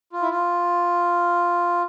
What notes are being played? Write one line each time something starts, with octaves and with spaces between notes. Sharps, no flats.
F4
E4
F4